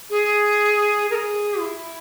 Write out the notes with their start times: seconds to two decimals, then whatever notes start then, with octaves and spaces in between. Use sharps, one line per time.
0.10 G#4
1.11 A#4
1.15 G#4
1.60 E4